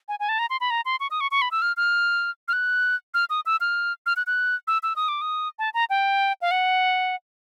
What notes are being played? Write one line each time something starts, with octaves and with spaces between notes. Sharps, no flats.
G#5
G#5
A5
A#5
C6
B5
A#5
C6
C#6
D#6
C#6
C#6
B5
E6
F6
F6
F6
F#6
F6
D#6
E6
F6
F6
F#6
F#6
E6
E6
D#6
D6
D#6
A5
A#5
G5
F5
F#5